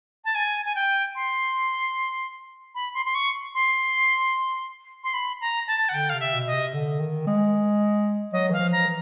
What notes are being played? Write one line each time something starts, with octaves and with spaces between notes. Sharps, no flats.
A5
G#5
G#5
G5
C6
B5
C6
C6
C#6
C6
C6
B5
A#5
A5
F#5
D3 G5
C3 F5
E5
B2
D#5
C3
D3
D#3
G#3
F#3 D#5
E3 F5
F3
A#5
E3